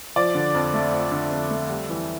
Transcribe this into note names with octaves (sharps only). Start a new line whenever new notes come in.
F3 D5
D3
F2
A3
F3
D3
F2
A3
G3
E3